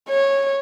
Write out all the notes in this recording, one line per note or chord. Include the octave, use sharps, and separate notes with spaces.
C#5